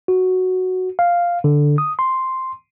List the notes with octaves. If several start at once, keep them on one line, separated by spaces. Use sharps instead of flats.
F#4
F5
D3
D#6
C6